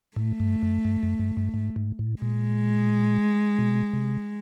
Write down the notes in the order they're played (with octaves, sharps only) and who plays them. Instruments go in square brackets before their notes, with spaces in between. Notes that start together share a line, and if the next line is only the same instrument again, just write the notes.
[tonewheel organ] A2 [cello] A3
[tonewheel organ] G2
F#2
G2
F#2
G2
G2
G#2
G#2
A2
[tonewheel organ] A#2 [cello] G#3
[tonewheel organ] B2
C3